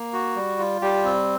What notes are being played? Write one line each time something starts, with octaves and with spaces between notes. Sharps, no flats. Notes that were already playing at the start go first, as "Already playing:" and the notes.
Already playing: A#3
F#4
G3
F4
G3 G4
C4